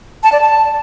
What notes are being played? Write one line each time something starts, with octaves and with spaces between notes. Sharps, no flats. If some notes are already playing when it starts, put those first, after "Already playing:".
A5
D5
A5